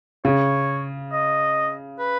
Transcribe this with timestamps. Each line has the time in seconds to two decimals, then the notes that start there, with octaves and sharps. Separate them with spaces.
0.25 C#3 C#5
1.12 D#5
1.99 B4